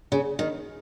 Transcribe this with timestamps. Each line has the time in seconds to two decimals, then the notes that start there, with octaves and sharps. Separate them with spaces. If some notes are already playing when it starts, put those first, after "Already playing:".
0.12 C#3
0.39 D#3